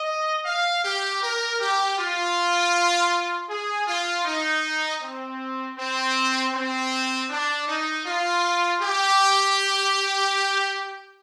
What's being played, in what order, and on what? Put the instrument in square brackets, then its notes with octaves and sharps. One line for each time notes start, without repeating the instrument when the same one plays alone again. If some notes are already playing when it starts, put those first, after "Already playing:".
Already playing: [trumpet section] D#5
F5
G4
A#4
G4
F4
G#4
F4
D#4
C4
C4
C4
D4
D#4
F4
G4